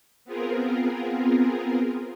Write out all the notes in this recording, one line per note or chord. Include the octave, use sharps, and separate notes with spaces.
B3 C4 F4 G#4 A#4